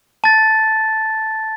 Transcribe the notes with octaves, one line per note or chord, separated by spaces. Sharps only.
A5 A6